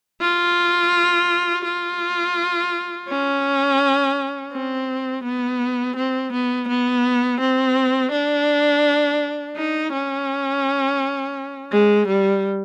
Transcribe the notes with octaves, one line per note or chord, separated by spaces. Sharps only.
F4
F4
C#4
C4
B3
C4
B3
B3
C4
D4
D#4
C#4
G#3
G3